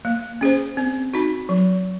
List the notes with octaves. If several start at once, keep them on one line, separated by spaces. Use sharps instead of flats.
A#3
C#4 G#4 C5
C4
D#4 F#4
F#3